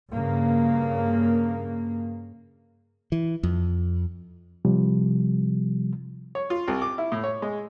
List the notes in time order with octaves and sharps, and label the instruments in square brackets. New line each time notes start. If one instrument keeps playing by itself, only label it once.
[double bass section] G2 C#3 A#3
[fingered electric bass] E3
F2
[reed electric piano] C3 F3 G3
[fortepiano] C#5
F4
C2
D6
E4
A2
C#5
G#3